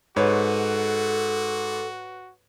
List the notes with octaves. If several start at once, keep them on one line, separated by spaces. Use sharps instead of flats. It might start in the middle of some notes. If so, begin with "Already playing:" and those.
G#2 F#4 A4 B4 C#5